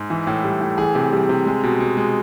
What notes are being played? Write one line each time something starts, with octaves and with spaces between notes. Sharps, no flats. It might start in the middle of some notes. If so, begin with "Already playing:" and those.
Already playing: G#2
E3
A2
G3
A2
E3 G#4
C3
G3
C3
G#3
B2
B2
G#3